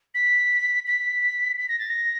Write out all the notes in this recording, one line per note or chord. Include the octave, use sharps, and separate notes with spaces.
B6
B6
B6
A#6
A6
A#6